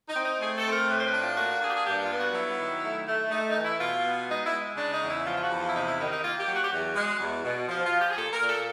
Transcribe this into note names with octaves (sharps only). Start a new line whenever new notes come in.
D#4
C4
D#4
A3 G#4
A4
C4
A#4
A2 B4
C5
B4
D4
F4
A#3 F#4
F#4
D4 G#4
G4
G#4
G2 G4
F4
B3
F#4
F#3 E4
D#3
A3
A3
A3 D#4
D#4
E3
E4
B2 F4
B3
G#3 D#4
E4
G#3
C#3 D4
D#4
E2
E4
F3 F4
F4
F#4
E2
F4
E4
C3 D#4
E4
D#3 D#4
D#4
A#3 F4
G4
F#3
F#4
G4
E2 F#4
G#3
E2
B2
F3
F4
F3
G4
G#4
A#2 A4
A#4
A#2
A4